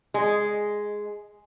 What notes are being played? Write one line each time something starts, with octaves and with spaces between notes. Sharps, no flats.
G#3